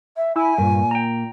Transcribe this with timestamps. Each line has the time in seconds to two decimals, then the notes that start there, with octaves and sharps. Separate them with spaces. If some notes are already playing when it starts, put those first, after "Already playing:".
0.17 E5
0.36 E4 G#5
0.58 G2 A#2
0.91 G5 A#5